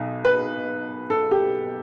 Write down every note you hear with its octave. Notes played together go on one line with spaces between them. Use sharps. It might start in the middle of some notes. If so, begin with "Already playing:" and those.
Already playing: B1 B2
B4
A4
G4